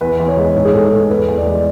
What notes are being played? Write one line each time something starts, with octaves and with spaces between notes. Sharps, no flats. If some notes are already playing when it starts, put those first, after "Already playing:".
E2 B4
E2
C#5
G#3
G#2 C#5
G#4
G#2 A4
A3 A4
E2 B4
E2
D5
G#3